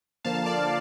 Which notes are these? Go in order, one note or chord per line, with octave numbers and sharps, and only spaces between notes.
D3 F3 A#3 F5 A5
D5 F5